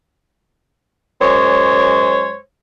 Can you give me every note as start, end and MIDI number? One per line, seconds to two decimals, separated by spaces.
1.21 2.38 42
1.21 2.38 56
1.21 2.38 72
1.21 2.38 73